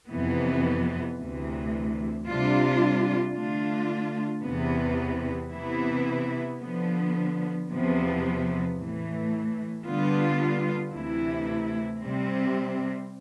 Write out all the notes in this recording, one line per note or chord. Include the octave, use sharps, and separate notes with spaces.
F2 C3 E3 B3
D2 C3 E3
C3 G3 D4 F4
D3 A3 D4 F4
E2 C3 E3 B3
C3 E3 B3 E4
D3 F3 B3
E2 C3 F3 B3
A2 E3 A3
D3 G3 B3 F4
D2 C3 E3 A3 E4
C3 G3 C4